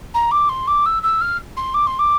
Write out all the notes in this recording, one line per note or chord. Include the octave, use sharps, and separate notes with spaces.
A#5
D6
C6
D6
E6
E6
F6
C6
D6
C6
D6